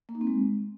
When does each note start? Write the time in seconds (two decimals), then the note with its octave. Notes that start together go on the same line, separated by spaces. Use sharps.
0.09 A#3
0.15 D#4
0.21 C4
0.27 G#3